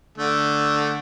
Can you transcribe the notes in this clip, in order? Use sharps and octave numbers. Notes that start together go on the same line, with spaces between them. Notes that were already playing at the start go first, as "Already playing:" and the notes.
D3 A3